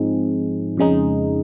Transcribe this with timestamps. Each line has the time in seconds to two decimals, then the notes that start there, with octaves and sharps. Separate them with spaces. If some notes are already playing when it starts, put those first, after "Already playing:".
Already playing: G#2 F3 C4 D#4 G#4
0.77 F2 C#3 G#3 D#4